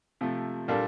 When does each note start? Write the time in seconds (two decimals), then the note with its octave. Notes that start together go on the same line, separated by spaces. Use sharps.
0.21 C3 F3 A3
0.68 A#2 G3 A#3 D4 A4